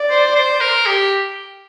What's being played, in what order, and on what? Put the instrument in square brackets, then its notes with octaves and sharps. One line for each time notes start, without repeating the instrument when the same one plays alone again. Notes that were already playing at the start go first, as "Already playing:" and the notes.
Already playing: [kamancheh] D5
[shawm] C5
C5
A#4
G4